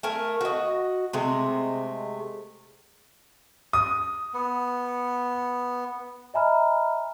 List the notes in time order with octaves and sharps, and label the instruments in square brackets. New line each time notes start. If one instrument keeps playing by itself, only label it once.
[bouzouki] A3 A#4 G#5
F#4 D#5
C3 G#3 A3
[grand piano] D#6
[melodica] B3
[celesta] D#5 E5 G#5 A#5 B5 F6